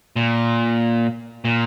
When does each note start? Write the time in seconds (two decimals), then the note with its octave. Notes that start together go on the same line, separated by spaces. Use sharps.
0.16 A#2
1.45 A#2